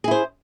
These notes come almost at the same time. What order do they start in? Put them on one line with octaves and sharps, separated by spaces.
G#4 E4 C5